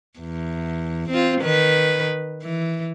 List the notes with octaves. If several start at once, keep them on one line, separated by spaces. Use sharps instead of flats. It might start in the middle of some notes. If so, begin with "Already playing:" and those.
E2
C4 F4
D#3 B4
E3